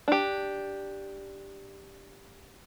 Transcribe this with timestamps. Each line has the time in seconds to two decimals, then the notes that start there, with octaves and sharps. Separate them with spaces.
0.08 D4 G4